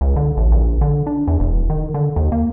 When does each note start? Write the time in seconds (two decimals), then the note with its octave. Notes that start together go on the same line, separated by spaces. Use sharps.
0.01 C#2
0.16 D3
0.37 A1
0.52 A#1
0.81 D3
1.07 D4
1.27 E2
1.40 E1
1.70 D#3
1.94 D3
2.16 D#2
2.32 A#3